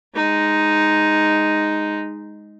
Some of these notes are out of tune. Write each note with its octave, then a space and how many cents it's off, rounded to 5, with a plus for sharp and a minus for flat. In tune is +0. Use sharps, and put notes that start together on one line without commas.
G#3 +0 D#4 +0